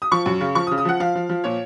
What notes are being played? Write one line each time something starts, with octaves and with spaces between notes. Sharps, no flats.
D#6
F3 C#6
F#2
C#3
F3 C#6
D#6
C#3
D#6
F3 F#5
F3 F5
F3
F3
A#2 C#5